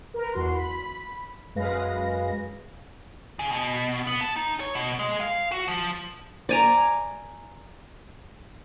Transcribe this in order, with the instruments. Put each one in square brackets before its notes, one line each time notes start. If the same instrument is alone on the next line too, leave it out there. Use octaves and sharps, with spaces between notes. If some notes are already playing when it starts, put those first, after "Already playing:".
[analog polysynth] A#4 B4
E2 F#4 C6
B5
F#2 G#3 B4 F5 A#6
[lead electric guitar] C#3
B2
B3
A5
D#4
C#5
B2
G#3
F5
F#4
F3
[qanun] D5 G#5 A#5